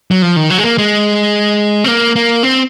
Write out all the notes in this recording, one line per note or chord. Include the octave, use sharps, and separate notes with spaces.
F#3
F3
D#3
F#3
G#3
A#3
G#3
C4
A#3
A#3
C4